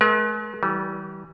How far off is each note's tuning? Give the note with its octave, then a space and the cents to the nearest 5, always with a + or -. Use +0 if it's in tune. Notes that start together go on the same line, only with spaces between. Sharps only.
G#3 +45 A#4 +45
E3 -25 G3 -30